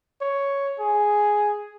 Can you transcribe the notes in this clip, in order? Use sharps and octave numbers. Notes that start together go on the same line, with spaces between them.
C#5
G#4